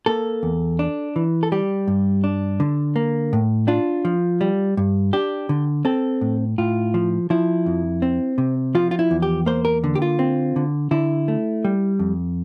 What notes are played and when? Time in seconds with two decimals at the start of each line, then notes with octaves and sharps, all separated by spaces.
0.06 A#3 A4
0.43 E2
0.79 D4
1.16 E3
1.43 A4
1.52 G3 G4
1.88 G2
2.24 D4
2.60 D3
2.96 A#3
3.33 A2
3.68 D4 F4
4.05 F3
4.41 G3
4.77 G2
5.13 D4 G4
5.49 D3
5.85 C4 A4
6.21 A2
6.58 A2 F4
6.94 F3
7.30 F3 E4
7.66 F2
8.02 C4
8.38 C3
8.75 F3 F4
8.91 F4
8.99 E4
9.11 E2
9.22 G4
9.46 A#3 C5
9.65 A#4
9.84 D3
9.95 G4
10.02 F4
10.19 C4
10.56 D3
10.91 D3 E4
11.28 A3
11.65 G3
11.99 F2